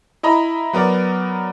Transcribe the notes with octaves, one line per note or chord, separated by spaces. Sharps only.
E4 D#5 A#5 B5
F#3 B3 A#4 D5